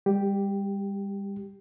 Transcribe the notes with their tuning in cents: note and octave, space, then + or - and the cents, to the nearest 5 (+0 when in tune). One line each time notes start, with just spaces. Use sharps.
G3 +30 G4 +0